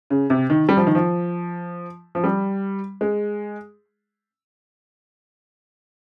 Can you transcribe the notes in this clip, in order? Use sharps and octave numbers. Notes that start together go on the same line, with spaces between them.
C#3
C3
D#3
G3
F3
D#3
F3
F3
G3
G#3